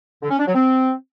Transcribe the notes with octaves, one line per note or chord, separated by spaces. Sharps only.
D3
C#4
D4
F#3
C4